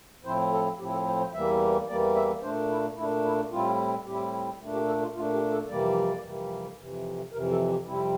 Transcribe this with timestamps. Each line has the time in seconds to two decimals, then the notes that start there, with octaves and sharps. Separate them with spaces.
0.25 A2 F3 C4 E4 C5
0.52 A4
0.79 A2 F3 C4 E4 G4
0.92 A4
1.07 C5
1.20 C5
1.33 E2 E3 G3 A#3 E5
1.88 E2 E3 G3 A#3 D5
2.16 E5
2.42 A#2 A3 D4 C5
2.70 E4
2.97 A#2 A3 D4 E4
3.25 E4
3.51 A2 G3 C4 E4 F4
4.06 A2 G3 C4 E4 G4
4.61 A#2 A3 D4
4.73 G4
4.88 A4
5.02 F4
5.15 A#2 A3 D4 F4
5.34 G4
5.52 A4
5.69 F2 C3 E3 G3 A#3 D5
6.24 F2 C3 E3 G3 A#3
6.78 F2 C3 E3
7.32 F2 C3 E3 A#4
7.51 A4
7.69 G4
7.87 F2 C3 G3 C4 E4